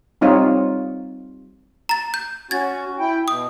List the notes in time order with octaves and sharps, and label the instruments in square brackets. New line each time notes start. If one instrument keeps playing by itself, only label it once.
[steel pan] G3 C4 D#4 F4 C#5
[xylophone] A#5 A6
G6
[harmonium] C#4 F#4 [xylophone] G#6 A6
[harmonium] E4 G5
[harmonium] B2 [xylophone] D#6